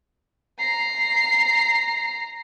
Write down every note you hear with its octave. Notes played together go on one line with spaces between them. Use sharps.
A#5 C7